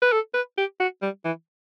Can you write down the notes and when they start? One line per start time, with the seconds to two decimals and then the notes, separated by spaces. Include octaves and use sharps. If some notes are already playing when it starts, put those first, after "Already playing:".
0.02 B4
0.12 A4
0.34 B4
0.57 G4
0.80 F#4
1.02 G3
1.25 E3